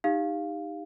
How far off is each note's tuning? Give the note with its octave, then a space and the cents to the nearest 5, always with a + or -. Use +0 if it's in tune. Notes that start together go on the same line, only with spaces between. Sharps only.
D#4 +0 G4 +20 F5 +0